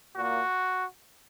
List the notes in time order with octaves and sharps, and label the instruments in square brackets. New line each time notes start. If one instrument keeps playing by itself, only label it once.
[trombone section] A#2 A#3 F#4